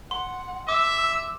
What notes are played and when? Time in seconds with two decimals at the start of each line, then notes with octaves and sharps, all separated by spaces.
0.11 F#5 C6
0.69 E5 D6 E6